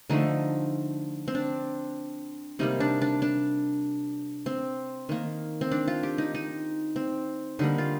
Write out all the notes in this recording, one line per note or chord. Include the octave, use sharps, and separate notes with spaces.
D3 F3 A3 D#4
C4
D4
C3 G3 A#3 D#4
D4
D4
D4
C4
D#3 A#3
C4
D4
F4
G4
D#4
D#4
C4
D3 G3 A#3 D#4
F4